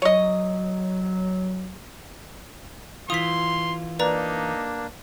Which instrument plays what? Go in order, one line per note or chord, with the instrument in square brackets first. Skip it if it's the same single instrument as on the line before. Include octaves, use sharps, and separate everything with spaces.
[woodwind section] F#3 [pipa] C#5 D#5
[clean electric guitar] E3 F4 [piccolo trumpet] C6 [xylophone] D#6 B6
[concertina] A#3 D4 [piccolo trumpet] D#4 [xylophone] B4 D5 A#5